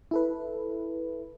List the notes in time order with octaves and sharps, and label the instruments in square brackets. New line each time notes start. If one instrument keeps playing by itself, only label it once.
[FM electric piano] E4 A4 B4